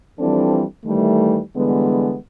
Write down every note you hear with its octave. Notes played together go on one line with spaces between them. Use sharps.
E3 F3 G3 C4 D4 A4
D#3 E3 G3 A3
D3 E3 G3 G#3 B3